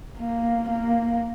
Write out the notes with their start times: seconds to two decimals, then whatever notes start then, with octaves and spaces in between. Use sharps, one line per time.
0.18 A#3
0.70 A#3